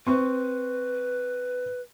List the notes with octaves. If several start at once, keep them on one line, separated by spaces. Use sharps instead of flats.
C4 B4 C#6